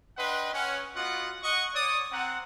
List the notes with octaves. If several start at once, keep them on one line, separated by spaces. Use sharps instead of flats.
D4 B4 D#5 F#5 G5 C6
C#4 F#5
B3 F4 F#4 D#5 F#5
D#5 F#5 C#6
C#5 D5 D#6
C4 F#5 A#5